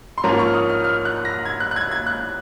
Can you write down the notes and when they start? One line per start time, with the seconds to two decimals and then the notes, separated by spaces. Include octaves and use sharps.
0.18 C6
0.24 G#2 F3 A#3 C#4 A#5
0.39 C#6
0.47 F6
0.54 D#6
0.69 F6
0.84 F6
1.05 F#6
1.25 A#6
1.45 G#6
1.60 F#6
1.71 F#6
1.76 G#6
1.91 G#6
2.06 F#6